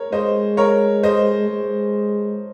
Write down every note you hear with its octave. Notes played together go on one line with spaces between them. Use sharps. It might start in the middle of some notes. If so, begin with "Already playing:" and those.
Already playing: A#4 C#5
G#3 C5 D#5
A#4 C#5
C5 D#5
G#3